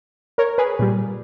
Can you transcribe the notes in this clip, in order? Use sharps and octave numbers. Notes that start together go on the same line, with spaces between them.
A#4 C#5
G#4 B4
A#2 G3